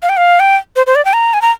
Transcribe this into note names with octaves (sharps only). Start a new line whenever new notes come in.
F5
G5
F5
G5
C5
C5
D5
G5
A#5
G#5
A#5